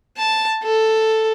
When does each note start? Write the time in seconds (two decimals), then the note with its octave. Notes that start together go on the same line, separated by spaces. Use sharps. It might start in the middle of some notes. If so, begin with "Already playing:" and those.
0.18 A5
0.64 A4